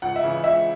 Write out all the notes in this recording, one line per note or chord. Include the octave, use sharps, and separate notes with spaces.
C#2 F#5
E5
C#3 E3
C#2 E5